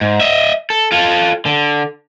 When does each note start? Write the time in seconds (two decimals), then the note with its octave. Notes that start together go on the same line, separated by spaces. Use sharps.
0.01 G#2
0.21 D#5 E5
0.70 A4
0.92 F4 A4
1.46 D3